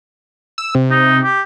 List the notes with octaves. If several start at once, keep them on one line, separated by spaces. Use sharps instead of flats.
E6
C3
D#4
G4